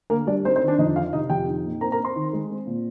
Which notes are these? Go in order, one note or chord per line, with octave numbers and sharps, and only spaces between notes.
D3 A#3 A#4
G3 D4 D5
C4 D#4 C5
C4 C5
D#3
D4 D5
F2 D#4 D#5
D#3 F4 F5
C3 D#4 D#5
F2 G4 G5
D#4
A#2
C4 A#4 A#5
A#4 A#5
C4
C5 C6
D#3
G#3
C4
A#2